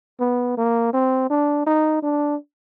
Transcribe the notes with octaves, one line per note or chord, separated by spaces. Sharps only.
B3
A#3
C4
D4
D#4
D4